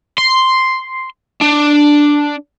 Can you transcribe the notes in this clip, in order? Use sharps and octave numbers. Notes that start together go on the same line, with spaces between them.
C6
D4